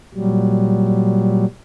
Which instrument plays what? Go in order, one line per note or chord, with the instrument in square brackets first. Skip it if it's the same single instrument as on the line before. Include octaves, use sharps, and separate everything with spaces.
[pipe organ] A#2 F#3 G3